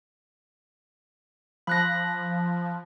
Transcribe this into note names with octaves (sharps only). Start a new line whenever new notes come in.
F3 B5 F#6 A#6